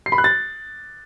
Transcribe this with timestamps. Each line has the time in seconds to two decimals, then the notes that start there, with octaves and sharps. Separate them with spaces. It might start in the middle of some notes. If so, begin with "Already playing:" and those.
0.06 C7
0.12 B5
0.18 F#6
0.24 A6